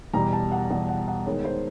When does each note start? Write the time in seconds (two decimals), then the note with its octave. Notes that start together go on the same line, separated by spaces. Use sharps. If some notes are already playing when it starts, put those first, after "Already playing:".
0.13 E2 B2 G3 A#5
0.33 A5
0.52 F#5
0.70 E2 B2 G3 F#5
0.89 F#5
1.08 F#5
1.26 D#3 G#3 B3 D#4 C#5
1.45 C5